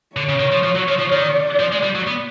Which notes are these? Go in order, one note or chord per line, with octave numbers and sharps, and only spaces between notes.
D3 C#5
C#3
D#3
F3
F3
F#3
F3
F3
D#3 D5
F3
G#3
G3
F#3
B3